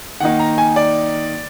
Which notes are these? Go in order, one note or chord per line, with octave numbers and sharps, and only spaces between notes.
D#3 A#3 D#4 F#5
A#5
G#5
D5